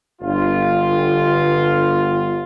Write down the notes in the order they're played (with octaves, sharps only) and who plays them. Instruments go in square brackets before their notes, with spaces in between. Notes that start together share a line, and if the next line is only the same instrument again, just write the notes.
[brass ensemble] G1 F4